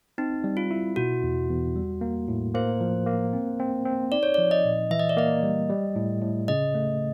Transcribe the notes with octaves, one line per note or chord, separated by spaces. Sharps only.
C4 D#4
G3
F4
E4
B2 F#4
E2
E2
G3
A#3
A2
A#3 C5
F3
A#3
C4
C4
C4
D#4 D5
C#5
F3 D5
D#5
A#2
E3 E5
D#5
D5
A#3 D#5
G3
G3
A2
A2
C#3 D#5
A3